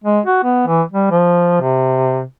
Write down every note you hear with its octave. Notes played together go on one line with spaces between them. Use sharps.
G#3
F#4
B3
E3
G3
F3
C3